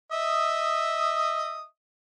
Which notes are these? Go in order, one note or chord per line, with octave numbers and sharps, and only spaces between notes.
D#5 E5 D#6